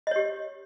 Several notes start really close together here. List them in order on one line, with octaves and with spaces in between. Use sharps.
D#5 C#5 G4